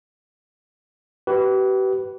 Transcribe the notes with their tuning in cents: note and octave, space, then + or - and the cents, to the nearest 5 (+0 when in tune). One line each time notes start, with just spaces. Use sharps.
G4 -40 B4 +0